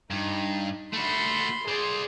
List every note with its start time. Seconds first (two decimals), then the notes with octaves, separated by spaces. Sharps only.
0.11 G2 D#4
0.94 A3 F#4 B5 C6
1.68 G#4 C5 D5